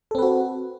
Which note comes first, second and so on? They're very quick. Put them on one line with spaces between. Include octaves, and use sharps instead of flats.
A4 C4 B4 F#4